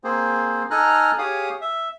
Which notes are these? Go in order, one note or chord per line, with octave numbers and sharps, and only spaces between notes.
A#3 C4 G#4 C5
D#4 A4 G#5 A#5 F6 F#6
G4 G#4 C#5 F5 D#6
E5